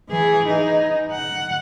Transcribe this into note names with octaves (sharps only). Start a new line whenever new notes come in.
E3 G#4
D#4
F#5